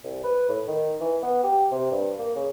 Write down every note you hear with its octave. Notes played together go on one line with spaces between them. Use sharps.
C2
B4
A2
D#3
E3
B3
G4
C3
G2
A#3
C#3